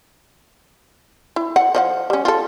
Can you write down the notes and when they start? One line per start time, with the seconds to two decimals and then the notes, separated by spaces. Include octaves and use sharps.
1.36 E4
1.56 F#5
1.75 F3 D#5 F#5
2.10 G3 C#4
2.25 F4 G4 A4